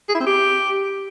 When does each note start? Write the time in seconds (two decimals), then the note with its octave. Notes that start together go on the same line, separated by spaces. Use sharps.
0.08 G#4
0.14 E4
0.20 C4
0.26 G4